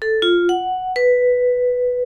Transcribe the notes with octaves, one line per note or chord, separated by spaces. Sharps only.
A4
F4
F#5
B4